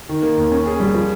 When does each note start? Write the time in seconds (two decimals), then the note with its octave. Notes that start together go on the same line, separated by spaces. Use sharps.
0.09 D#3
0.22 A#3
0.38 D#2
0.52 C#4
0.66 G#4
0.80 G3
0.94 F3